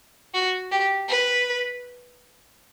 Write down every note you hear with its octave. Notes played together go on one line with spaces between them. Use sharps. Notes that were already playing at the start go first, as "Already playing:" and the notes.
F#4
G4
B4